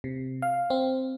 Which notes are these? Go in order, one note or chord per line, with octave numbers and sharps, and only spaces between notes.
C3
F5
C4